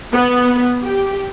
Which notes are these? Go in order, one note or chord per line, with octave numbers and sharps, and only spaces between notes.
B3
G4